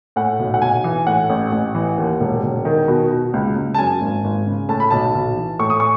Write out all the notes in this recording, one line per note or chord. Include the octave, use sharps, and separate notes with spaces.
A2 F#5
B1
F#5
B1 G#5
E3
A2 F#5
A1
A1
E3
D#2
E1
E1
D#3
B2
B2
C#2
C#2
A5
F#2 G#5
G#1
G#1
C#3
A2 A5
B5
B1 A5
B1
E3
A2 C#6
D#6
C#6